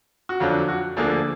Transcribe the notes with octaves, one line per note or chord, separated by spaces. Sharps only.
F#4
F2 D3 F#3 D4 F4
F#4
D2 D3 F3 A#3 D4 G#4